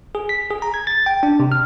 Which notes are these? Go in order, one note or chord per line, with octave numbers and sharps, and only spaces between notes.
G#4
B6
G#4
A#5
G#6
A6
G5
D4
C3
F6